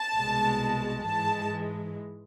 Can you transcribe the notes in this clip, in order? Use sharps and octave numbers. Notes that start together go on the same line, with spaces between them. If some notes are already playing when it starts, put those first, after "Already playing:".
Already playing: A5
C2 B2 G#3
G#2 E3 G#3 A5